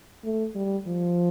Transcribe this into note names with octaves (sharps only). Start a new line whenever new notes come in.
A3
G3
F3